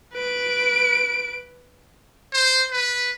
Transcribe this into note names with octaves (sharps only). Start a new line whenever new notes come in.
B4 D7
C5
B4